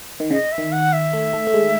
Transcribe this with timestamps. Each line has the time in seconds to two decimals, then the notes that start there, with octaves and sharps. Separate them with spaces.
0.20 D#3
0.31 C#3 D#5
0.52 E5
0.58 D#3
0.72 F#5
0.93 E5
1.13 A3
1.33 A3
1.47 A3
1.54 G#3